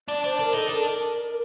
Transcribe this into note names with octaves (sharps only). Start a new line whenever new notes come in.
D4 D5
D4 C5
D4 A#4
D#4 A4
D4 A#4